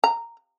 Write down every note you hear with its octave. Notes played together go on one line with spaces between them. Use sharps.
A#5